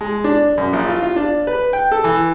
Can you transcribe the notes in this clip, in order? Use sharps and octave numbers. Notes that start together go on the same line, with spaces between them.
G#3
D4
F#2
A#1
F4
F4
D4
B4
G5
A4
E3